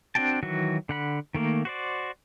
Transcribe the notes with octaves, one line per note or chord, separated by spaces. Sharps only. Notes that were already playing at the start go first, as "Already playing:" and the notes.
C4 D4 F#4 G5 A5
D#3 E3 F#3 F#4
D3 F#5 B5
D#3 A3 A#3
F#4 C5 D5